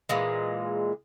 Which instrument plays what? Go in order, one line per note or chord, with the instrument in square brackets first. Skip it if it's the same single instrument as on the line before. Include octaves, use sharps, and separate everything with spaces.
[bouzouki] A#2 E3 G#3